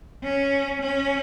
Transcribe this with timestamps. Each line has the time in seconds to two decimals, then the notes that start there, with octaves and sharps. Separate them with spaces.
0.23 C#4
0.82 C#4